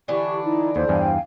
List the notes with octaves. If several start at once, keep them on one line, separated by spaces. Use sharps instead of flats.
D3 E3 D4 E4 G4 C#6
D#4 E4
D#2 A4 C5
E2 G2 F5 G5 G#5